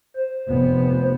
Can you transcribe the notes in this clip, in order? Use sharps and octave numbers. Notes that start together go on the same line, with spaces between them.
C5
F1 B3